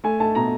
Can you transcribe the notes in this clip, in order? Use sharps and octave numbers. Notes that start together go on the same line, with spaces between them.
A3 G#5
A3 A5
B2 A#5